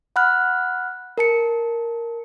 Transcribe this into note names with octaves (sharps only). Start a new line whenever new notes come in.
F#5 B5 F6 F#6
A#4 A5 C#7